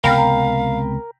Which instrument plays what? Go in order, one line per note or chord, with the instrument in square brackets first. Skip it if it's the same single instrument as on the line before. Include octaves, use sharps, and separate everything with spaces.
[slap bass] C#2 C3 B3 [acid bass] A#4 [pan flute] F5 [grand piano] G5 A#5 B5